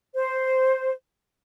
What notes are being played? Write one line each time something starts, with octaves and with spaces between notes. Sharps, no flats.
C5